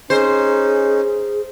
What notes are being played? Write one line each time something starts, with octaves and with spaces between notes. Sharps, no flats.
C#4 D#4 G#4 C5